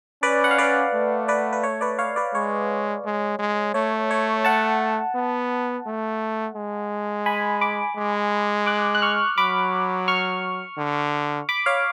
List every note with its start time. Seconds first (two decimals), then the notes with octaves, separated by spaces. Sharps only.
0.23 C#4 B4 D5
0.44 F#5
0.51 F5
0.58 B4 D5
0.94 A3
1.28 B4 D5
1.53 B4
1.63 C#5
1.81 B4 D5
1.98 C#5 F5
2.16 B4 D5
2.34 G#3 C#5
3.05 G#3
3.39 G#3
3.74 A3 C#5
4.11 C#5
4.45 F#5 A5
5.15 B3
5.86 A3
6.55 G#3
7.26 G#5 B5
7.61 B5 D6
7.97 G#3
8.66 D6 F#6
8.95 F#6
9.02 C#6 F6
9.38 F#3 B5 D6
10.08 C#6 F6
10.77 D3
11.49 B5 D6
11.66 C#5 F5